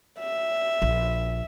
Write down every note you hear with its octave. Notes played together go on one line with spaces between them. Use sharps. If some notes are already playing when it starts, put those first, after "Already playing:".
E5
A#1